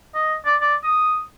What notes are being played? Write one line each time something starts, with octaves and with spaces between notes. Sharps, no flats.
D#5
D5
D5
D#6